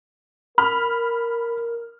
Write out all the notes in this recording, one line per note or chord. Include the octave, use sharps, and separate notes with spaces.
A#4 B5 F6